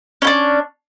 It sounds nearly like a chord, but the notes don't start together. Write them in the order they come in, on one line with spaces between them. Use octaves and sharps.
C#4 E4 D4